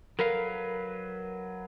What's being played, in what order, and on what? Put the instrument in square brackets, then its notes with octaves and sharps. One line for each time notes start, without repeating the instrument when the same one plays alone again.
[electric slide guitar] F#3 B4 F5 [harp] A#4